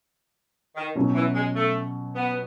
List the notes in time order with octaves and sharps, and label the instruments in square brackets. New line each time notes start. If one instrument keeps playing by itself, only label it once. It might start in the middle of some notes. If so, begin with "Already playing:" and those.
[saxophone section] D#3
[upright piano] B2 F#3 C#4 F#4
[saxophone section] E3
G#3
A3
B3